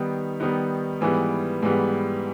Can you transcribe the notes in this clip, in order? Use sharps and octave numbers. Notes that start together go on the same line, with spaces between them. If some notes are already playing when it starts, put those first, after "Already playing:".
Already playing: D#3 G3 B3 D#4
D#3 G3 B3 D#4
G#2 E3 G3 B3
G#2 E3 G3 B3